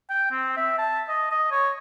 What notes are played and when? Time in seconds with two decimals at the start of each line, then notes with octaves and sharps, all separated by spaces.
0.10 G5
0.31 C4
0.57 E5
0.79 A5
1.09 D#5
1.31 D#5
1.51 C#5